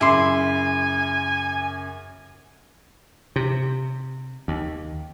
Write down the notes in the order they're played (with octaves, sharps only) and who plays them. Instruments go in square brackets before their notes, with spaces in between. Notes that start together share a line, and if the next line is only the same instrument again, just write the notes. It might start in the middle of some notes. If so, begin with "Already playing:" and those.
[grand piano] F#2 C#3 D6 [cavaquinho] E4 C6 [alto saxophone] G#5
[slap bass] C3
D#2